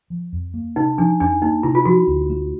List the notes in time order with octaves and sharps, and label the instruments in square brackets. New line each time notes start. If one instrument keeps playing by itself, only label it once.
[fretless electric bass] F3
F2
A#3
[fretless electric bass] C3 [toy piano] D#4
[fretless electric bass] F3 [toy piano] D4
[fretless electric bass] F2 [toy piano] D4
[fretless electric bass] A#3 [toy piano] D#4
[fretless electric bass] C3 [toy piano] E4
[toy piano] F4
[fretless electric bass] F3 [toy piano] F#4
[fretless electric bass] D2
A3